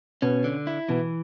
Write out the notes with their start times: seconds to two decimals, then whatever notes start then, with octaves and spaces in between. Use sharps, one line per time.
0.22 B2 C#4
0.44 D3
0.67 E4
0.88 B2 E3